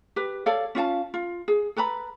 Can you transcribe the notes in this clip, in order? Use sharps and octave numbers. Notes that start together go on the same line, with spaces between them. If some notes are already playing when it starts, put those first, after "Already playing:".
G4 B4
A4 C#5 D5 F5
C#4 F4 F5 A5
F4
G#4
A4 B4 A#5 B5